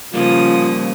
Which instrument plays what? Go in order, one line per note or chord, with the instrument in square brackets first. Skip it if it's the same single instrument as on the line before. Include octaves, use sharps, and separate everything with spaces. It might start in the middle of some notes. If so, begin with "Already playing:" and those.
[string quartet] C#3 F3 D#6 [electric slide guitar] G3 A#3 [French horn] F4